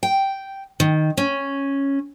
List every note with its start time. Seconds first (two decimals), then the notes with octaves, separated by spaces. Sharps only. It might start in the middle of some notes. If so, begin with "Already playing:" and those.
0.03 G5
0.80 D#3
1.17 C#4